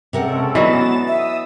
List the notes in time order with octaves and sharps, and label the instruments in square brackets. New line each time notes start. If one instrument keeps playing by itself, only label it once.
[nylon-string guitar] C3 A#4 F#5 [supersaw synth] G#3 C#4 A4
[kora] E3 F#3 [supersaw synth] B3 A6 E7 [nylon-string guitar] D5 D#5
[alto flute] E5 [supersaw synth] D#6 E6